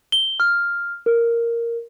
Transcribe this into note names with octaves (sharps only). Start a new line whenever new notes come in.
G7
F6
A#4